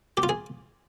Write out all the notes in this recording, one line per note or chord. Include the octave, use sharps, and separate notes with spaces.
G4
F4
G#4